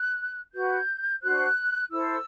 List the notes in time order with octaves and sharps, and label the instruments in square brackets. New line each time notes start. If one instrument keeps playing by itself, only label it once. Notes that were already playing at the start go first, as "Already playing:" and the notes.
Already playing: [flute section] F#6
F#4 B4 G6
D4 F#4 C5 F#6
E4 A4 C5 E6